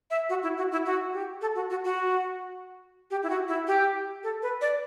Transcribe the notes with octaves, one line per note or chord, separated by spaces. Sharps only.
E5
F#4
E4
F#4
E4
F#4
G4
A4
F#4
F#4
F#4
G4
E4
F#4
E4
G4
A4
B4
D5